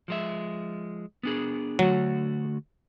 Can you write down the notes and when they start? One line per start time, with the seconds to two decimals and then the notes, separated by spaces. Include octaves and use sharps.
0.08 F3 G#3 E5
1.23 B3 D4 G#4
1.79 D3 F#3 A3 F#4